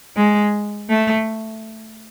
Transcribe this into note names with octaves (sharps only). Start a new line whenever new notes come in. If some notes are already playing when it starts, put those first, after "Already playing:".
G#3
A3